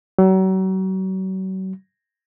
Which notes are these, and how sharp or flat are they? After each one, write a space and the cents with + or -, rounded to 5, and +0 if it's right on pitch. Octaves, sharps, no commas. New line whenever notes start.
F#3 +35